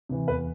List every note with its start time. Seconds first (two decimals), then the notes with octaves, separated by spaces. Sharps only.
0.09 C3 E3
0.27 E2 B4